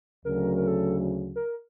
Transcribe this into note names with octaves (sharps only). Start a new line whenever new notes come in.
D2 C#3 F#3 A#4
A#4
A4
A#4